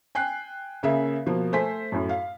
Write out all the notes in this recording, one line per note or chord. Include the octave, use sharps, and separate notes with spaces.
G5 G#5 F#6 C7
C#3 A#3 G#4 E5
B2 F3 A#3
A3 C5 G#5 B6
F#2 A2
F5